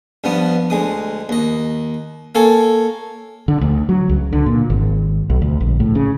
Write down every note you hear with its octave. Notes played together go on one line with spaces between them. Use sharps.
G2 F3 B3 D#6
D2 G#3 D#6
D#2 D#5
A#3 A4 C#5 G#5
D3
D2
F#3
C#2
D3
A#2
G#1
B1
D2
A#1
A2
C#3